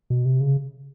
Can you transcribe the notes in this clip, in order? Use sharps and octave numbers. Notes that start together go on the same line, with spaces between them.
B2
C3
C#3